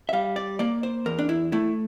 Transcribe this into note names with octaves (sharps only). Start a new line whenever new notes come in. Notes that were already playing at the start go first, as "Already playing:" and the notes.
E5
G3 F5
D5
A#3 D5
C5
E2 A#4
D4
E4
A3 E4